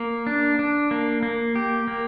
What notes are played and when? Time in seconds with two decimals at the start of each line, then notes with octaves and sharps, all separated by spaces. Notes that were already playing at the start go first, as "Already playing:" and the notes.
Already playing: A#3
0.27 D4
0.59 D4
0.91 A#3
1.23 A#3
1.55 G4
1.88 A#3